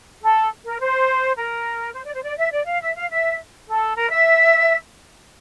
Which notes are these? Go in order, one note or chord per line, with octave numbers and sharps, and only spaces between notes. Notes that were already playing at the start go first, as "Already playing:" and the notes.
A4
A#4
C5
A#4
C5
D5
C5
D5
E5
D5
F5
E5
F5
E5
A4
A#4
E5